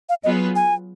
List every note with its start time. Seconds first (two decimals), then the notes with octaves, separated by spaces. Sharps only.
0.09 F5
0.24 F#3 B3 F4 G#4 B4 D#5
0.56 G#5